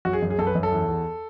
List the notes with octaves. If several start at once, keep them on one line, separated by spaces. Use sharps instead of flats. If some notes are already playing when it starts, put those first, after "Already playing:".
F#2 F#4
G#4
F#2
G#4
F#2 A4
B4
F#2
A4
E2
E2